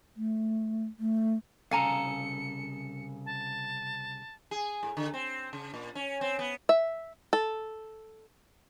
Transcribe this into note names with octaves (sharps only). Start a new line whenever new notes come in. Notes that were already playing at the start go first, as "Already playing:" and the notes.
A3
A3
C2 C#3 A4 F5 G#5 A#5 C#7
A5
G#4
A2
D3
C4
C#3
A#2
C#4
C4
B3
E5
A4